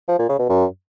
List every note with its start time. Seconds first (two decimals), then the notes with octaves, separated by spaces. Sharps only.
0.08 F3
0.18 A#2
0.29 C#3
0.39 B2
0.49 F#2